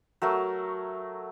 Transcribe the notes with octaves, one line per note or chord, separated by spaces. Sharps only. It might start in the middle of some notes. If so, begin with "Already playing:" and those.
F#3 A3 A#4